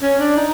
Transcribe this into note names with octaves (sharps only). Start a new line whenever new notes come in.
C#4
D4
D#4